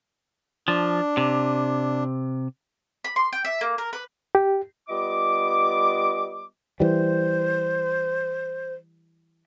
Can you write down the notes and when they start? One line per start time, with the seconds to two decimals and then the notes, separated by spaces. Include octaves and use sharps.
0.68 F3 D4
1.17 C3
3.04 B5
3.16 C6
3.33 G5
3.45 E5
3.61 A#3
3.78 A#4
3.93 B4
4.35 G4
4.89 G3 B3 F4 D#5 D6
6.80 E3 G3 C5